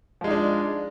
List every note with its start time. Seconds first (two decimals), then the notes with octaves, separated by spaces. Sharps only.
0.21 F3
0.24 G#3
0.27 D#4
0.30 D4